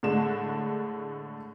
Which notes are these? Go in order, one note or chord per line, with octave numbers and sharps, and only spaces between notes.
A2 D3 G#3 A3 D4 E7